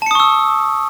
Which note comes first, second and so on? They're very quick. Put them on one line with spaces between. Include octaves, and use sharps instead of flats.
A5 C#7 D#6 C#6 E6